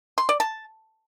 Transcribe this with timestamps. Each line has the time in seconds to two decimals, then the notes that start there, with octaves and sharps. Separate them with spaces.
0.18 C6
0.29 D5
0.40 A5